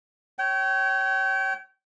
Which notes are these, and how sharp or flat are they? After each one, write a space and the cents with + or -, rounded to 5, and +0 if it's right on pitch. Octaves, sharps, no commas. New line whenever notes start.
C#5 -5 G5 -35